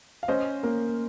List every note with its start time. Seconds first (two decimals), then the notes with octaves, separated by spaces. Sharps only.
0.23 F5
0.28 C#4 C5 D#5
0.63 A#3